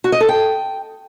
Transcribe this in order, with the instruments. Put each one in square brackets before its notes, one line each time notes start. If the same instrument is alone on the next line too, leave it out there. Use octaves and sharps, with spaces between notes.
[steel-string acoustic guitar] F#4
D#5
A4
G5